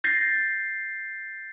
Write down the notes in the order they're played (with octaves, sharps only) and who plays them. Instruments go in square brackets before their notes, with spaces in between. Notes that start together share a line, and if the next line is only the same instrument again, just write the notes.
[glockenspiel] G6 A6 A#6 C7